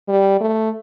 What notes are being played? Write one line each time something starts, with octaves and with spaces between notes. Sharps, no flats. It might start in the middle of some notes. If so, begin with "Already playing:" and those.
G3
A3